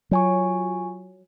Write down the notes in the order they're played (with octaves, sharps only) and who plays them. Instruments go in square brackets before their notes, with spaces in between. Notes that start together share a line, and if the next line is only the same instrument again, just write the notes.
[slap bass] F#3 [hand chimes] F4 G#5 C#6